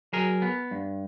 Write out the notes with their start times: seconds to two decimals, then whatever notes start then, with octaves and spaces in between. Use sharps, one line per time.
0.13 F#3 G#4 A#4
0.42 B3
0.71 G2